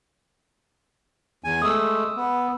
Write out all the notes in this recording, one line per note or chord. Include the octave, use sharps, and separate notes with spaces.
E2 G#5
G#3 A3 D#6 E6
B3